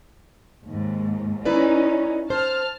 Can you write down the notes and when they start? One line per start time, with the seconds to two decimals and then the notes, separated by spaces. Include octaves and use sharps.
0.66 D#2 G#2
1.45 C#4 D#4 E4 B4 D5
2.30 C5 A5 F6